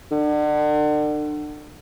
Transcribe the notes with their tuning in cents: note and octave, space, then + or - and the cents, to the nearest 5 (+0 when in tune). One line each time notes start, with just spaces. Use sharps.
D3 +35